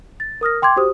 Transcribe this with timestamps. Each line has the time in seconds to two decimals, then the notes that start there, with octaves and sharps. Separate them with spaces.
0.20 A6
0.41 A#4 D#6 F6 A#6
0.62 G5 C6 D6 G#6
0.76 F#4 G4 C5 D#6